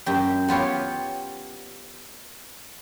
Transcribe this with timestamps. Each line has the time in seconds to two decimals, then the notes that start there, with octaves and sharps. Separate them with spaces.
0.06 F#2 G4
0.48 B3 F4 G4 C#5